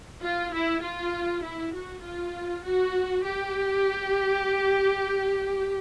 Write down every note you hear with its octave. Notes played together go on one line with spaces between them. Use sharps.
F4
E4
F4
E4
F#4
F4
F#4
G4